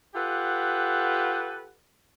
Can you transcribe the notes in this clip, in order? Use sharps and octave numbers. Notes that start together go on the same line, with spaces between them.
F4 G4 A4 B4 F#5